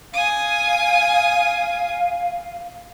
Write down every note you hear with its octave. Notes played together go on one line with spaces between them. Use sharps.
F5 G#5 D#6